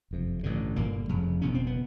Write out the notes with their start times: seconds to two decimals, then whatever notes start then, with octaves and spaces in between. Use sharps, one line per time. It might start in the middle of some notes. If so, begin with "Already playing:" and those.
0.11 F#1 F2 C3
0.43 A1 G2 D3
0.76 G1 G2 A#2 D3 A#3
1.09 F1 F2 C#3
1.42 F#1 E2 B2 C#4
1.55 C4
1.67 B3